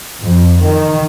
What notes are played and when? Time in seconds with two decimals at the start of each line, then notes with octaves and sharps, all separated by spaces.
0.22 F2
0.61 D#3